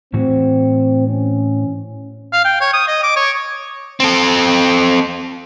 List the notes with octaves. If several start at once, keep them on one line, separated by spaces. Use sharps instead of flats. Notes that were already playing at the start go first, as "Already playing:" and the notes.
A2 E3 C4 F#4
C#4
F5
G5
C#5
D#6
D#5
D6
C#5
C4 A4